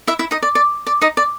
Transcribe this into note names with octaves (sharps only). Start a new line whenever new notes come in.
E4 E5
E4 E5
D#4 D#5
D5
D5
D5
D#4 D#5
D5